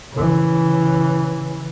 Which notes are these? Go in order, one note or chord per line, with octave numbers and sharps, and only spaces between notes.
C#3 E3